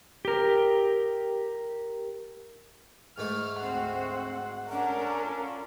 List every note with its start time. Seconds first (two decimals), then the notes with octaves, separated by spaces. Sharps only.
0.25 G4 A#4
3.18 G#2 A3 E4 F6
3.61 D2 C4 F#4 C5 F#5
4.69 C#4 D4 A4 A#4 F#5
5.23 F4